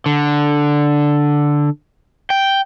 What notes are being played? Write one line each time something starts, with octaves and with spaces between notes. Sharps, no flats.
D3
G5